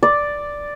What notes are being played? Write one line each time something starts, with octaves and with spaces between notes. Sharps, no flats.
D5